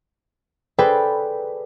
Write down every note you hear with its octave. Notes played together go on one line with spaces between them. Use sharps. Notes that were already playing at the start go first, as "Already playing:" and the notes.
G#4 A4 B4 C5 D5 G5